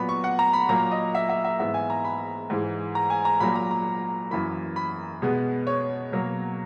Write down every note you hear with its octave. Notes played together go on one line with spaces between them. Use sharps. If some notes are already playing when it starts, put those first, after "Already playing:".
Already playing: A#2 F#3 B3 B5
C#6
F#5
A#5
B5
A#2 F#3 A#3 A#5
D#5
E5
E5
E5
G#2 E3 G#3 B3 E5
G#5
A#5
B5
G#2 E3 G#3
A#5
G#5
A#5
A#2 F#3 A#3 B5
A#5
A#5
F#2 E3 A#3 B5
B5
B2 G#3 B3
C#5
B2 F#3 A#3